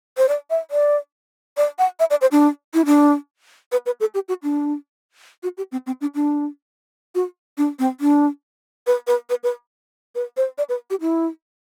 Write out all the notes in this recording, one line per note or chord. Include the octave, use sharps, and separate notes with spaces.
C5
D5
E5
D5
D5
F#5
E5
D5
C5
D4
E4
D4
B4
B4
A4
G4
F#4
D4
F#4
G4
C4
C4
D4
D4
F#4
D4
C4
D4
B4
B4
B4
B4
B4
C5
D5
B4
G4
E4